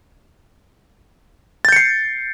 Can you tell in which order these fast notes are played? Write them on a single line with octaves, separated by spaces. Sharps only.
A6 G6 C#7 C7